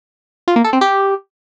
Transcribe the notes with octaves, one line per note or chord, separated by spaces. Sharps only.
F4
A#3
A4
C4
G4